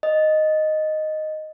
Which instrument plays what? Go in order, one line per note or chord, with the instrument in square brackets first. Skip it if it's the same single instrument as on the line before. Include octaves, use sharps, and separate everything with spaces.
[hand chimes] D#5